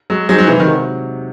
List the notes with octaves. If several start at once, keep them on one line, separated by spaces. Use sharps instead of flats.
F#3 G#3
F#3 D#4 G#4 C5
F#3
C3 E3
D#3
F#3